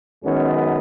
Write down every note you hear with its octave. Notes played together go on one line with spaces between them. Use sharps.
F#2 D#3 G#3 B3 C#4